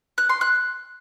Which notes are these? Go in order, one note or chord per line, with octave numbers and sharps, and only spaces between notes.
F#6
C6
F#6